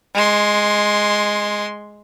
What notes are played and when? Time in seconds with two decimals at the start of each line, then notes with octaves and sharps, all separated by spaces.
0.14 G#3 C6